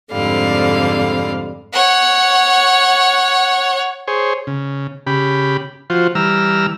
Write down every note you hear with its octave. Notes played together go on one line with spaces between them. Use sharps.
F2 G#2 D3 G3 F5
C#5 F#5
G#4 C5 C#5
C#3
C#3 G4 B5
F3 F4 F#4 C5
E3 G3 A#5 E6 F6